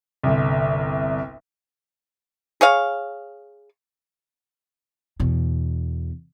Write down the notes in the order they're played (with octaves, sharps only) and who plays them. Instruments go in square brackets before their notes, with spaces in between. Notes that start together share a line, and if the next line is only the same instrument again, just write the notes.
[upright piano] G1 C2
[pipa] G#4 C#5 F5
[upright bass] E2 B2